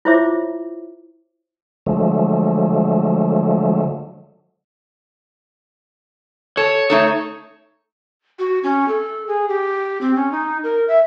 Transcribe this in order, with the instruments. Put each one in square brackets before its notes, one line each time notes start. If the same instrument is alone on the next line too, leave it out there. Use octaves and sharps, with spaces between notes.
[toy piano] E4 F4 C5 C#5 E5 D6
[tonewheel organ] D3 F3 F#3 G#3 A3
[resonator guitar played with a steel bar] A4 A5 [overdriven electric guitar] C#5
[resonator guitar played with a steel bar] A3 D#4 A4
[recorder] F#4
C#4
A4
G#4
G4
C4
C#4
D#4
A#4
E5